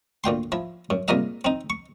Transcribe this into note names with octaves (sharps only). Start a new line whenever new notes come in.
D2 A#2 G5 C6
F3 E4
F#2
C2 A#2 G#3 A#4 D#5 E5
C4 D#4
C#6